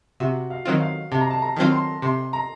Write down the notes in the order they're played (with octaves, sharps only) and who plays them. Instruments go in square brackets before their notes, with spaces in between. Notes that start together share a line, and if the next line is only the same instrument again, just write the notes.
[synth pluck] C3 [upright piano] F#4
[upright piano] F5
[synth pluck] D#3 F#3 C4 F4
[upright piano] F5
[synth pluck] C3 [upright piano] A5
[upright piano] A#5
A5
A#5
[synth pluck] D#3 F#3 C4 F4
[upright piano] C6
[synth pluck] C3 [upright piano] C6
[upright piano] A#5